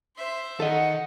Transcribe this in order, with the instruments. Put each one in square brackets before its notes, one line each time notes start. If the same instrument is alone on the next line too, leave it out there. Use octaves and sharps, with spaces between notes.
[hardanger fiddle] C5 E5
[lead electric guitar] D#3 [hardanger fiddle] D#4 [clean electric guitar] A4 D#5 [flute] F#5